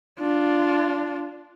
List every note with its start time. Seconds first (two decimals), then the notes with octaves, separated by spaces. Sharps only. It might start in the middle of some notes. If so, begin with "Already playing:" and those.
0.19 D4 F4